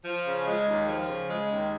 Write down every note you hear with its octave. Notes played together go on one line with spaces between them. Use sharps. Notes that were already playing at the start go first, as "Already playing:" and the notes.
F3
C#3
G#3
D#2
F3
C#3
G#3
D#2